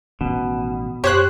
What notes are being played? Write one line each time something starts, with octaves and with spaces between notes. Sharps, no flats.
A1 B2 D#3 C#4
F#2 G4 C5 C#5 F#6